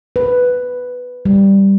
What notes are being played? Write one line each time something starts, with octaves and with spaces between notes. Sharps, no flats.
B4
G3